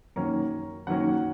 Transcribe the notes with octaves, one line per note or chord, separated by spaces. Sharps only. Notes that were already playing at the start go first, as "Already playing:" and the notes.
F#2 D#3 F#3 A#3 C#4 A#5
F#2 D#3 F#3 A#3 C#4 F#5